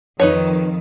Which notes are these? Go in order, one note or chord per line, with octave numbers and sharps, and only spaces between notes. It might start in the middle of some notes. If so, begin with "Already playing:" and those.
F2 D#3 D#4 B4 C#5